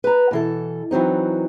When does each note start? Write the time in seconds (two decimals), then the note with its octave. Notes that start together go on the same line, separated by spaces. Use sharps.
0.04 B4 A#5
0.31 B2 E3 A4
0.91 E3 F#3 C4 D#4